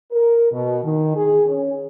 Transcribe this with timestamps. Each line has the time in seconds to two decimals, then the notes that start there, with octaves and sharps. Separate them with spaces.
0.12 A#4
0.52 B2
0.84 D#3
1.16 G#4
1.47 C#4